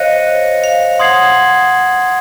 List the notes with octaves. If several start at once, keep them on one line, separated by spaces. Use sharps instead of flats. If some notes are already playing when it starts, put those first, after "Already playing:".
Already playing: C5 C#5 D#5 F5 F#6 A#6 C#7
F5
F#5 C6 D#6 G#6 C7 F#7